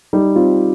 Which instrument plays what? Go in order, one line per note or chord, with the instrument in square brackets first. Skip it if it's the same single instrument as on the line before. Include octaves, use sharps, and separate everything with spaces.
[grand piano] G3 [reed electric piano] D#4
[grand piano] C4 [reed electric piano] F4